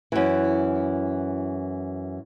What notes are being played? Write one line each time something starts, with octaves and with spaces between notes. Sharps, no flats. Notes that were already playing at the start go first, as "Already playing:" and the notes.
F#2 E3